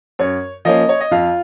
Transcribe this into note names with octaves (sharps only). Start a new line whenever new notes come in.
F#2 C#5
F3 A#3 C#4 D#5
C#5
D#5
F2 F4 F5